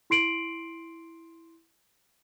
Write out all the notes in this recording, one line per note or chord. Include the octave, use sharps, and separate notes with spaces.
E4 C6 C7 D7 F#7